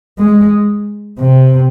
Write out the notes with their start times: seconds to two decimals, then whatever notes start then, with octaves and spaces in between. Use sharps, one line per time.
0.19 G#3
1.20 C3